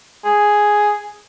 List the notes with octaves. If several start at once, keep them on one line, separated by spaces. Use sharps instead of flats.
G#4